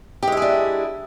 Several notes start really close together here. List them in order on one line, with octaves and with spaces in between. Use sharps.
G4 G#3 E4 G#4 D4